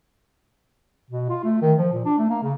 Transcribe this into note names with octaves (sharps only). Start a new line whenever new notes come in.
B2
F4
A3
D#3
F3
A#2
D4
A3
A#3
C#3